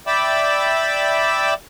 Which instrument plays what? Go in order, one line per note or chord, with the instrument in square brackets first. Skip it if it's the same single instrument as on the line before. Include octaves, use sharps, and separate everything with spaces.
[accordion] D5 E5 G5 B5 D6 E6